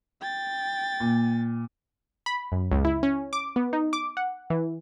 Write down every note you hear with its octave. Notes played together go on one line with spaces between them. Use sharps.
G5 A6
A#2
B5
F#2
C#2
E4
C#4
D6
B3
D#4
D6
F#5
E3